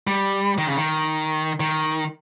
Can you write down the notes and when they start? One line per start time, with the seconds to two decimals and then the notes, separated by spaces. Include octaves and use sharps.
0.07 G3
0.58 D#3
0.67 C#3
0.77 D#3
1.60 D#3